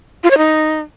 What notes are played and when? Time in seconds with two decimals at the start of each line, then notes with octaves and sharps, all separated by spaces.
0.24 F4
0.31 C#5
0.38 D#4